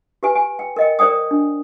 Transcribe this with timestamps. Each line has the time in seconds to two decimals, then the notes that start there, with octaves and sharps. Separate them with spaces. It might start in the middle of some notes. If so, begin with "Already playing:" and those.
0.23 G4 B4 G#5
0.35 G#5
0.59 G5
0.76 A#4 D#5 G5
0.99 A#4 C5 D5 G5 D#6
1.31 D4